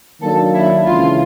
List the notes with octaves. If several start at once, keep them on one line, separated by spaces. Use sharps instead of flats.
D#3 F#3 A#3 D4 A4
E4
C#2 C#3 E3 F4